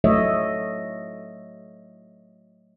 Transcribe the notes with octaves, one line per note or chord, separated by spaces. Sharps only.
F#3 A3 C#5 D#5 E5